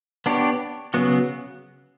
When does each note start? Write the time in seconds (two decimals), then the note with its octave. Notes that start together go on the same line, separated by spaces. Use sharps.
0.26 B3 D4 G4 C#5
0.94 C#3 F#3 B3 F#4